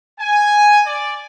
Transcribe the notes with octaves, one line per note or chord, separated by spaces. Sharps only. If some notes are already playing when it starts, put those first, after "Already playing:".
G#5
D5